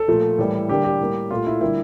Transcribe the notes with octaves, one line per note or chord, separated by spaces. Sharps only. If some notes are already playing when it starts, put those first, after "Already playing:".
Already playing: A4
A#2 F3 A3
A2 E3 G3 A#3
D3 G3 A#3 G4
G4
A2 G3 A#3
A#2 A3 F4
E4
D3 G3 A#3 E4